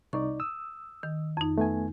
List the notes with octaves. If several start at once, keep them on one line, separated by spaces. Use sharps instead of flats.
C2 D#4 D5 C#6
D#6 E6
D#3
F2 D#4
A3 B3 G#5